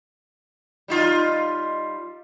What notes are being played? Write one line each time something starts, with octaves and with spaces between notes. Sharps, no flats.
G3 D#4 F4